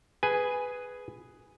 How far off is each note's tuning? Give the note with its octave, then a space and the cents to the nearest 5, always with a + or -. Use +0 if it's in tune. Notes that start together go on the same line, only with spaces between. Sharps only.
G#4 +0 B4 +5 G#5 +0